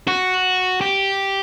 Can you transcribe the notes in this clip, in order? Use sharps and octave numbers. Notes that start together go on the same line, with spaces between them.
F#4
G4